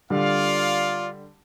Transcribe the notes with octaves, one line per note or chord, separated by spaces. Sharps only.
D3 G3 F4 D5 F5